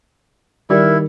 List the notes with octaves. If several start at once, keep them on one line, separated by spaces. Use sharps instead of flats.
D#3 G3 E4 A#4